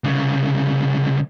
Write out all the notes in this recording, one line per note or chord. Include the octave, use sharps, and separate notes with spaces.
C2 C#3